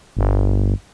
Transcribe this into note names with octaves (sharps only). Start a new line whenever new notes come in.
G1